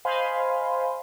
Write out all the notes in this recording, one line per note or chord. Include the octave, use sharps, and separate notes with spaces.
C5 D#5 F5 G#5 B5 C6